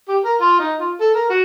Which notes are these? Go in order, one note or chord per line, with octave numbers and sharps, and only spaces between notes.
G4
A#4
F4
D#4
F4
A4
A#4
F#4